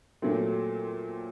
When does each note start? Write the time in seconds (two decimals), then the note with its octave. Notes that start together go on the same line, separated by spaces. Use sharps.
0.22 A#2 F#3 A3 C4